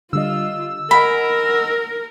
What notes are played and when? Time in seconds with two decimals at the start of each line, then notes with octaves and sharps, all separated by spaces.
0.13 D3 G3 F4 D#5 E6
0.91 A#4 D#5 F#5 G#5 B5